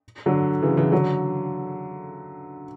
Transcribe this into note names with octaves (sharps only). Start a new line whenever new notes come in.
D3 F#3
C#3 E3
C#3 E3
D3 F#3